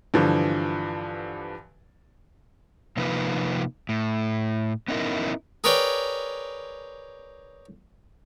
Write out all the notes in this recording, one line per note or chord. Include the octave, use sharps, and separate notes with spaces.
G2 D3 E3 F3
C3 F3 A#3 D#4 F4 B4
A2
B3 C#4 D#4 E4 A#4
G#4 A#4 B4 C#5 D5 G5